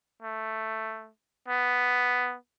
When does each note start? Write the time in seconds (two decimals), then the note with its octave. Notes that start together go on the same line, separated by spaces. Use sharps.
0.23 A3
1.48 B3